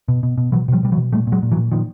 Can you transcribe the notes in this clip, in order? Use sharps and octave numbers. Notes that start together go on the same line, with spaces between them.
B2
B2
B2
B2 E3 F#3
B2 F3 G3
B2 G3
E3 F#3
B2
A#2 G3 A3
A#2
F#3 G#3
A#2
E3 F#3
A#2
A#2 D#3 F3